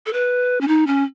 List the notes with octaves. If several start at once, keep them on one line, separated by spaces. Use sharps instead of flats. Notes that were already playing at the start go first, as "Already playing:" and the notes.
A4
B4
C#4
D#4
C#4